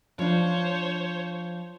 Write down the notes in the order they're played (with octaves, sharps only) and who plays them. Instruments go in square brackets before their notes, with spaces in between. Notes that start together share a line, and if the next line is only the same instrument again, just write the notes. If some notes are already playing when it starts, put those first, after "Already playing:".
[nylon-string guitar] F3 D4 [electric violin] C5 C#5